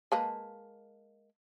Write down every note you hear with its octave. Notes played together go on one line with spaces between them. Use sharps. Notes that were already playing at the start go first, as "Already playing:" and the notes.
G#3 A#3 B4 A5